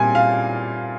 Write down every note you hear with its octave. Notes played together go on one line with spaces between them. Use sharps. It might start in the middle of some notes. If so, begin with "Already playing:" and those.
Already playing: A#2 G3 C4 G#5
F5